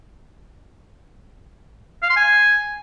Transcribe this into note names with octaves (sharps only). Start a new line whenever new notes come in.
F5
C6
G#5